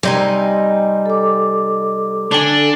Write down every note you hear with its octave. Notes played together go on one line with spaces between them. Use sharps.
C3 G3 D#4 G#5
A4 D6
D3 D4 G#5